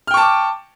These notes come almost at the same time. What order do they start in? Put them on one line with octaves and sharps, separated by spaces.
F6 G5 C#6 A5 D6